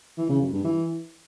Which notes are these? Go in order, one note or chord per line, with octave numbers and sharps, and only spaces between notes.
E3
C#3
F#2
G2
E3